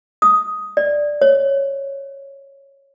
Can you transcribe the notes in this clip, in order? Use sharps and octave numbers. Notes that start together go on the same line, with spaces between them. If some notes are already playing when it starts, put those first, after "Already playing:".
D#6
D5
C#5